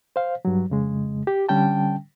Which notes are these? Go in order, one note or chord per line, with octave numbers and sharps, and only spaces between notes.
C5 F5
G2 F#3
F2 C#3 G#3
G4
D3 G3 C#4 G5 A5